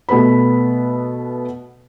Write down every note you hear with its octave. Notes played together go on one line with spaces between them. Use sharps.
B2 A3 B3 B4 B5